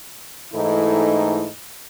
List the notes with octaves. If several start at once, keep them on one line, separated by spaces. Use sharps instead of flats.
G#2 E3 A3 D#4 E4 A4